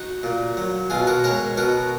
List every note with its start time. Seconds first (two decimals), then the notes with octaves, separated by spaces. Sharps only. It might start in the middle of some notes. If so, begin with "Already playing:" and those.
Already playing: D#4 F#4
0.23 A#2
0.57 F#3
0.90 B2 F4 G#4
1.07 F#4 A#4
1.24 G#3 A#4 C#5
1.57 B2 F#4 A#4